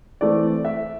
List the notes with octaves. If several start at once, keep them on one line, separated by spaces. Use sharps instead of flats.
E3 A3 C4 D5
E5